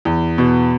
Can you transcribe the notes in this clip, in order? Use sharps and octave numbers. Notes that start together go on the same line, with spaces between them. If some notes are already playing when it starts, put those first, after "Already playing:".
E2
B2